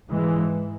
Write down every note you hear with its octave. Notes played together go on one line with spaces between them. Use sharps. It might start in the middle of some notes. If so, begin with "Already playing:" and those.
G#2 E3 G#3